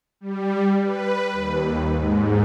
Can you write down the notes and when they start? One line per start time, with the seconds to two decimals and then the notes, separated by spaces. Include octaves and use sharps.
0.21 G3
0.84 B4
1.32 D#2
1.91 G#2